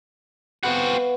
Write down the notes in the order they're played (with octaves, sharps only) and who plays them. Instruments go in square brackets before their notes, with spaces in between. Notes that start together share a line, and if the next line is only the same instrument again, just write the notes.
[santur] B3 F5 [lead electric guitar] C4 F#4